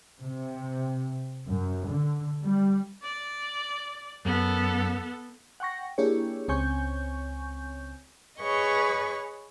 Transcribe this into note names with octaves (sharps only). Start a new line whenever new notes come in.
C3
F#2
D3
G3
D5
F#2 B3 A4
F#5 G5 C#6 A#6
A#3 D4 E4 G4 G#4 C#5
C#2 C4 C#5 G#5 C#6 G6
G#4 B4 C#5 D#5 C#6